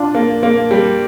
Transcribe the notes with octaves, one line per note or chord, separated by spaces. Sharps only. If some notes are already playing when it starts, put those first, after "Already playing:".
Already playing: D4 F4
A#3
A#3
G3